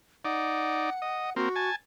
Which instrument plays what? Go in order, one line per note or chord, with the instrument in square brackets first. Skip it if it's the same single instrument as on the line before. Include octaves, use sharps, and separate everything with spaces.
[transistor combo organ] D#4 D5 [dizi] F#5
[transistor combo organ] D#5
[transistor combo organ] A#3 C4 [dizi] F#4
[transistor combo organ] G#5 A5